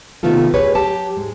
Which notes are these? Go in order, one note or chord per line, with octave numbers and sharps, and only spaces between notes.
C3 D#3 A3 B3 F4 A4
G4 G#4 B4 C#5
F#3 G4 A5
G#2 G#3